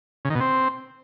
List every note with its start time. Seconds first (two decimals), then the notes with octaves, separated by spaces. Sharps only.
0.25 C#3
0.30 D#3
0.35 B2
0.40 C4